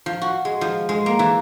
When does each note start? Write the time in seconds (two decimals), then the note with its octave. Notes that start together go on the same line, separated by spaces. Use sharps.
0.06 F3
0.22 F#4
0.45 G#3
0.61 F3
0.89 G#3
1.06 A#3
1.19 E3